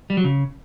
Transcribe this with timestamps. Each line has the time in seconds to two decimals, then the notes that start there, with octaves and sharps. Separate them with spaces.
0.10 G3
0.17 F#3
0.25 C#3